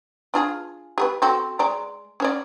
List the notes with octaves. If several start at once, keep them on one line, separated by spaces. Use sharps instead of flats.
D4 F4 G#4
G4 G#4 B4
C4 F#4 A4
G#3 D5 A#5
C#4 C#5 D5